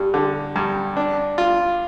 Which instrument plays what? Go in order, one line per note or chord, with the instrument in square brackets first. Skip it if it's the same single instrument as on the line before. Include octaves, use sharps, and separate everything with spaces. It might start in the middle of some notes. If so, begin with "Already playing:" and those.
Already playing: [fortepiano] G2 [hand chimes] G4
[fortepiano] D3
G2
D4
F4